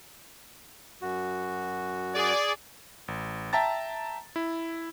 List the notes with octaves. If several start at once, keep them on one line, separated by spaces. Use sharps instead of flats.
F#2 F#4
G#4 D5
A1
E5 G5 A5 A#5 A6
E4